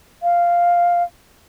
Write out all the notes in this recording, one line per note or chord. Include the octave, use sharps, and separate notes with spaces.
F5